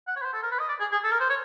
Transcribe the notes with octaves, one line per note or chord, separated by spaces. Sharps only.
F#5
C#5
B4
C5
A4
A#4
B4
D#5
D5
G#4
G#4
A4
A#4
C5
C#5